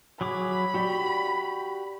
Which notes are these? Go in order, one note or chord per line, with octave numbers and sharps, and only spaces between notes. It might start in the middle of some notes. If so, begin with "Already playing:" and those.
F#3 G#4 B5 D6
F#4 G4 D5